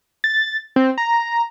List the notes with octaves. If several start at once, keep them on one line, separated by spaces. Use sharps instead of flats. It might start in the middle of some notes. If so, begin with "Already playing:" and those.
A6
C4
A#5